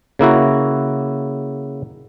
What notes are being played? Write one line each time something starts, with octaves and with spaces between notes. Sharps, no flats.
C#3 A#3 E4 F#4